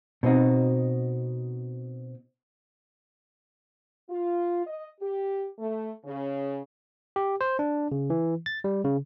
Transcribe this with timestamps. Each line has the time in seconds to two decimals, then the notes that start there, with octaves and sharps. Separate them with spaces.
0.23 B2 C4 D#4 F#4
4.09 F4
4.67 D#5
5.01 G4
5.59 A3
6.04 C#3
7.16 G4
7.41 C5
7.59 D4
7.92 C#3
8.10 E3
8.46 A6
8.64 G3
8.85 C#3